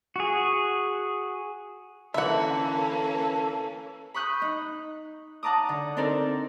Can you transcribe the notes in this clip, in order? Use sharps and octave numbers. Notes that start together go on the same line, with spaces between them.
F#4 G#4
D3 E3 A#3 C#4 A4 B4 E5 F#5
B5 C#6 D#6 F#6 G6
D#4
F#5 A5 A#5 D6 D#6
D3
C4 D4 D#4 A4 A#4 D5